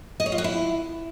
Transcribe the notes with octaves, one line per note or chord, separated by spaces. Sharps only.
D#5
C#5
F4
F#4
E4